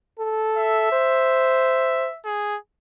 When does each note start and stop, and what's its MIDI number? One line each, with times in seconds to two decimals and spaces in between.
0.19 0.91 69
0.57 2.19 76
0.92 2.09 72
2.25 2.57 68